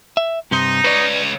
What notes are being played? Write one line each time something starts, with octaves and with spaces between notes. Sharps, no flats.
E5
G2 C3 D#4 C6
C#2 B4 C#5 D5